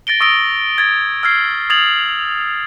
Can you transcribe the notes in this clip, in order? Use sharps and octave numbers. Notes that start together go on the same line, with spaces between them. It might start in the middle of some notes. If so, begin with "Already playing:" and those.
A6 A#6 D7 G7
C#6 D#6 E6 A#6 D7 G7
G#6 A6
E6 F6 G#6 C7
D#6 G#6 A6 F7 F#7